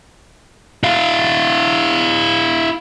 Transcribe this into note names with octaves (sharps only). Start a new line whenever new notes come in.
E4 F5